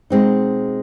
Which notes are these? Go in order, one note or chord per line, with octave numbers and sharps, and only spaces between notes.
B2 G#3 C4 D#4